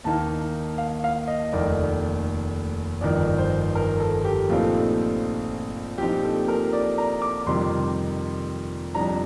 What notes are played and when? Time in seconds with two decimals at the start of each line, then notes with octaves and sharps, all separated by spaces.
0.04 D#2 D#3 A#3 D#4 A5
0.78 F5
1.04 F5
1.28 D#5
1.52 F1 D#2 D#3 A3 D5
3.01 G1 F2 D#3 D5
3.38 C5
3.75 A#4
4.00 A4
4.25 G4
4.49 A#1 A#2 A3 C4 D#4 F4
5.98 A#1 A#2 F3 C4 D#4 G4
6.23 A4
6.48 A#4
6.73 D5
6.98 A#5
7.22 D6
7.46 F2 C3 D#3 G3 C6
8.95 F2 C3 G3 D4 A#5